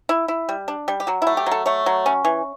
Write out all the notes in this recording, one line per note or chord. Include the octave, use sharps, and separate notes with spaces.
E4
E4
G3
D4
G3
G4
F#3 F#4
A3 E4
G4
F#3
A4
A3 C#5
F#3
C#4
E3